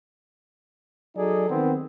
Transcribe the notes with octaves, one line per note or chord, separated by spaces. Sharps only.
F#3 D#4 G#4 A4 D5
D#3 B3 C4